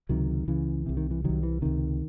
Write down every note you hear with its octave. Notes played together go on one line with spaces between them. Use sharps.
C#2 C3 D#3 F#3
C#2 C#3 E3
C2 C3
D#3
E3
C2 C3 D#3 F#3
E3
C#2 C3 D#3